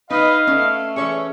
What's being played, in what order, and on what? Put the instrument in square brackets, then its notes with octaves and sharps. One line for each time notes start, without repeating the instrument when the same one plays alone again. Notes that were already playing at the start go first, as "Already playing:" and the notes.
[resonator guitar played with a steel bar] D#4 [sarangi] B4 [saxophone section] D#5 [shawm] F5
[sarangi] A3 [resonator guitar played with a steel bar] C#4
[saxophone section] E3 C#4 [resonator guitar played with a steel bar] G#4 C#5 E5 [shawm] C#6